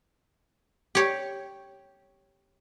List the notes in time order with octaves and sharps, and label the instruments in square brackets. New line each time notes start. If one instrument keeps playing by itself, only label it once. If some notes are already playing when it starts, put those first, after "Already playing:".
[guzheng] G4 C#5